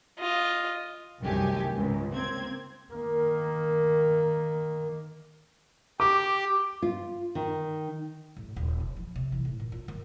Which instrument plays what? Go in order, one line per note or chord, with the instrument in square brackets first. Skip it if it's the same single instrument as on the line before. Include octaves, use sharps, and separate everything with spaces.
[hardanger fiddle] F4 D#5
[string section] C2 F#2 D#3 A3 G4 G#5
C#2 G#2
A#3 C4 G#6
[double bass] D#3 A#3
[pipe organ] G4 [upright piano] D6
[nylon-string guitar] F4
D#3
[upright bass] A1
D#1
C#3
F3
C3
E3
A2
A#2
F4
D#3